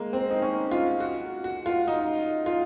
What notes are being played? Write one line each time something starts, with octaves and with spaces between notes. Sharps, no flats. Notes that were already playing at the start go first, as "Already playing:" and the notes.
Already playing: G#3 A#3
C4
D#4
C#4
F4
F#4
F#4
F4
D#4
F4